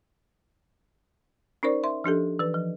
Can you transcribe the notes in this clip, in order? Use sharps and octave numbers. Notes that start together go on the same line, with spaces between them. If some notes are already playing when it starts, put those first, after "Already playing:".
C#4 D#4 A#4 C5 D5
E5 C6
F3 D4 G4 A4
E3 B4
F3